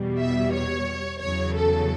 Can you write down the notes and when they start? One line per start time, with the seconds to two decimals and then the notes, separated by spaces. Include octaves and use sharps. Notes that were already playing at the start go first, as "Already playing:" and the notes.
Already playing: E2 B2 G3
0.19 E5
0.53 C#5
1.21 E2 C#3 F#3 C#5
1.55 A4